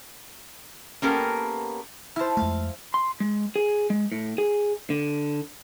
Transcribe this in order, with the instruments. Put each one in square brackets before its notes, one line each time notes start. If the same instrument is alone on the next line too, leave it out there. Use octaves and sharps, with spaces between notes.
[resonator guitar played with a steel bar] A#3 B3 C#4 G4 A4 A#4
[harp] E4 C5 [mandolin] A5 F6
[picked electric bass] F2 G#3 A3 [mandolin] F5
[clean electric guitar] C6
G#3
G#4
G#3
A2
G#4
D3